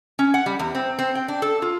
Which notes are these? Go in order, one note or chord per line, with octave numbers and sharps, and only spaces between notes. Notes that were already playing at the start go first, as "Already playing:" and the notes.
C#4
F#5
G3
E2
C4
C4
G5
D4
A4
F4